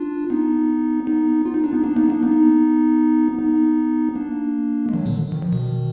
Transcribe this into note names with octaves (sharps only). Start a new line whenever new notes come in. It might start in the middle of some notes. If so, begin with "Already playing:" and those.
Already playing: D4 F4
B3 D#4
B3 D#4
F4
D#4
D4
B3 D#4
A#3 D4
B3 D#4
A#3 D4
B3 D#4
B3 D#4
A#3 D4
G#3
D#3 F#3
A#2 D3
D#3
F3
B2 D#3